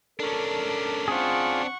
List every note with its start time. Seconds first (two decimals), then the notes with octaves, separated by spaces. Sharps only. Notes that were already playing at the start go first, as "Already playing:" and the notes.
0.20 C#4 D4 A4 A#4
1.08 C4 F4 G#4 F#5 C#6